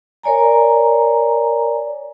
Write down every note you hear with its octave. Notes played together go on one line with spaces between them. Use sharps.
A#4 C#5 D5 G#5 A#5